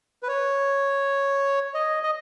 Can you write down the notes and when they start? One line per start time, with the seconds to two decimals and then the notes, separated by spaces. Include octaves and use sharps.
0.23 B4
0.28 C#5
1.74 D#5
2.03 D#5